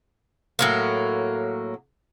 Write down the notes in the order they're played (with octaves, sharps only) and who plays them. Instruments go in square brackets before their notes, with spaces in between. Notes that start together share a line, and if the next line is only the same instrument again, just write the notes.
[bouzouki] A2 F#3 A#3